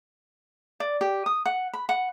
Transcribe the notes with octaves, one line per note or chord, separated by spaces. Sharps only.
D5
G4
D#6
F#5
B5
F#5